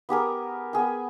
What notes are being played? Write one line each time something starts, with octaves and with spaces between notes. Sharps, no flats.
B3 G4 G#4 A#4
B3 G#4 G5